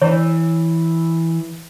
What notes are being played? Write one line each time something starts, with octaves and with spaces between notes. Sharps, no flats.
E3 C#5